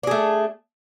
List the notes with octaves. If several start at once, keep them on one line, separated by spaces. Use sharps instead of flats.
A3 D4 G#4